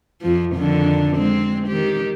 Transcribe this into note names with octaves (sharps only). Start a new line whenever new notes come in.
F2 F3
F2 D3 D#3
G#3 C4
D#3 G4